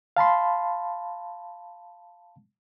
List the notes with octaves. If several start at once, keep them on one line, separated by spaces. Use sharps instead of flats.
F5 A5 B5 C6